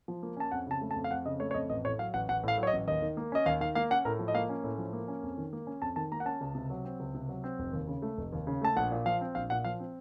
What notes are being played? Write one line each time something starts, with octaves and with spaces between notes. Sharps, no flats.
F3
A#3
C#4 A5
F2 F#5
C#3 A5
A3
A5
F2
F5
F2 F#5
C#3 D#5
A3 C#5
C#5
F2 D#5
A1 D#5
A2 C#5
F#3 F5
A1 F#5
A1 F#5
A2 F5
F#3
C#5
D#5
A1
D#2 D#5
D#3
A#3
C#4 D#5
D#2 F5
D#3 F5
A#3 F5
C#4 F#5
A2 A#4
F3
D#5
A#3 F5
C#4
A2
F3
A#3
C#4
F2
D#3
A#3
C#4
F2 A5
D#3 A5
A#3 A#5
F#5
C#4 A5
C#2
C3
F#3
C4
C#2
C3
F#3
C4
F1
D#2
C#3
A3
F1
D#2
C#3
A3 A5
A#1 F#5
A#2
F3 F5
C4
A#1 F5
A#2 F#5
F3 F5
C4